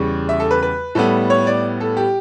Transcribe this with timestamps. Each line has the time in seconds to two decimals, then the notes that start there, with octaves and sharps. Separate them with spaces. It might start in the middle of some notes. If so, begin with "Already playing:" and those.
Already playing: E2 C#3 G3 C#6
0.29 E5
0.40 A4
0.51 B4
0.63 B4
0.95 A2 G3 B3 A4
1.30 C#5
1.47 D5
1.80 A4
1.97 G4